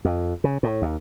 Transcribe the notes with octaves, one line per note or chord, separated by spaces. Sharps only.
F2
C#3
A2
D#2